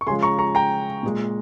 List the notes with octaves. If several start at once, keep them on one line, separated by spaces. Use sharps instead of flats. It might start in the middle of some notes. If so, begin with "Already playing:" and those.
C#6
C#3 F3 G#3 G#5 C6
A#5 C#6
A#5 C#6
G5 A#5
A#2 G#3